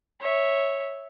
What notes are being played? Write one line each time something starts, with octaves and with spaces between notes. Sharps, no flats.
C#5 E5